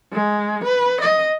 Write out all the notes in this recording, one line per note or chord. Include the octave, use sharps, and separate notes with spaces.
G#3
B4
D#5